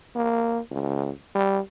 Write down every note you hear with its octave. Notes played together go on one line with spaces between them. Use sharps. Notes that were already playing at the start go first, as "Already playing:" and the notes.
A#3
C#2
G3